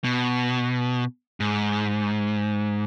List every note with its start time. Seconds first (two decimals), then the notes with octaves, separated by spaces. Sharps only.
0.04 B2
1.40 G#2